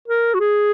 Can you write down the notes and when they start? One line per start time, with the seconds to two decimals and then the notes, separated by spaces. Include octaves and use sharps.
0.08 A#4
0.34 F#4
0.40 G#4